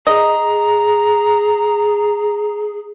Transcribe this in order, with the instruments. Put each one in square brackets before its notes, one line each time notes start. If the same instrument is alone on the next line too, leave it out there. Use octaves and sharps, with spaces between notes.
[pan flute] G#4 [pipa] D#5 [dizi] A#5